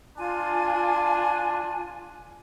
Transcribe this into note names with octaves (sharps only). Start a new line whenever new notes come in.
D4 F4 G#5